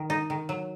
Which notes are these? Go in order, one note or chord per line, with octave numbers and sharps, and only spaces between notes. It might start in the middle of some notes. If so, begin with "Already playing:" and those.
Already playing: D#3
D#4
D#3
F#3